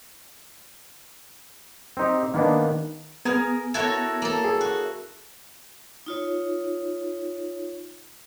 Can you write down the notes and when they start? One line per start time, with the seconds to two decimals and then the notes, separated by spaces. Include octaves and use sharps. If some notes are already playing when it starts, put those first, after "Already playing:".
1.97 C4 D#4 G4
2.34 D#3 A#3 B3 D4
3.25 B3 G#4 A#4 F6
3.74 E4 F#4 A4 A#4 C#5
4.22 A#3 A4
4.44 G#4
4.61 F#4
6.06 D#4 F4 C#5